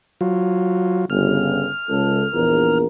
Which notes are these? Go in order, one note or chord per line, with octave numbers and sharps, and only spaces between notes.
F#3 F4
G1 C#3 F6
C#2 A4
A#1 E2 A#4